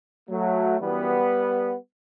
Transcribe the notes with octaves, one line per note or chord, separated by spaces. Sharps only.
F#3 A3
F#2 E3 G3 B3